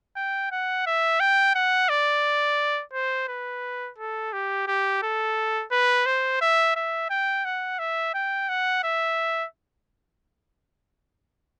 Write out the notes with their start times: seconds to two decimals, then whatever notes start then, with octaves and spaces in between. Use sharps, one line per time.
0.16 G5
0.51 F#5
0.86 E5
1.20 G5
1.55 F#5
1.89 D5
2.93 C5
3.28 B4
3.98 A4
4.33 G4
4.67 G4
5.02 A4
5.72 B4
6.06 C5
6.41 E5
6.76 E5
7.10 G5
7.45 F#5
7.79 E5
8.14 G5
8.49 F#5
8.84 E5